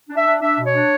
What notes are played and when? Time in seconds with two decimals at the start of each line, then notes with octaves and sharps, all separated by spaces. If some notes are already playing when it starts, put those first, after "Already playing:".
0.09 D4
0.16 E5
0.25 D4
0.41 D4 E5
0.58 B2
0.66 C#5
0.74 D4